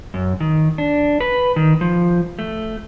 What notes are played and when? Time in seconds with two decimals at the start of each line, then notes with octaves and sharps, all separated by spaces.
0.14 F#2
0.40 D#3
0.78 D4
1.21 B4
1.56 D#3
1.81 F3
2.39 A3